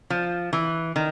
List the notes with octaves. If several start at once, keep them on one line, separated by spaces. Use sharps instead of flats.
F3
E3
D#3